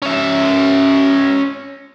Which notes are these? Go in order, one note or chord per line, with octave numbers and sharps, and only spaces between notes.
C#4 E5